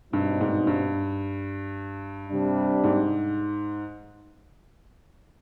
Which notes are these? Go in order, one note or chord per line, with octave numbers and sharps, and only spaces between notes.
G2 B2 G3 C4 D#4
G#2
G2
C3 G3 D4
G#2